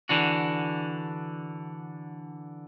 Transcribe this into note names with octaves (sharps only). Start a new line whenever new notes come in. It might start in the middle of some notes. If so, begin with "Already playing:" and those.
D3 E3 D4 F#4